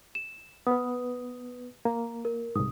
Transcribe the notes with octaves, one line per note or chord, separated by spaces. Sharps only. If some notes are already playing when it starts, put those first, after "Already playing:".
E7
B3 B4 D#6
A#3 A#5
A#4
C2 G#2 D#6